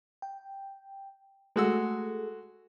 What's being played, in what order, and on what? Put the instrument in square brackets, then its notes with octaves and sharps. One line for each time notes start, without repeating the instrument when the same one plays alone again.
[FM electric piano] G5
[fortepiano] G#3 F#4 E6 [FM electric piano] A3 G#4 A4